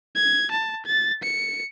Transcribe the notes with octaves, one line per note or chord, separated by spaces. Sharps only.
G#6
A5
A6
C#7